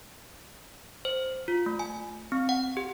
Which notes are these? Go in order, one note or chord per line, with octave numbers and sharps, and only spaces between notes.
C5
F4
A3
G#5
C4
F#5
G4